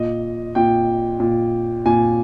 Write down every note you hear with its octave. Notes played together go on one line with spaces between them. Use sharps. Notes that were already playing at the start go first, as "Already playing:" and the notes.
Already playing: A#2 D#5
A#2 G5
A#2
A#2 G#5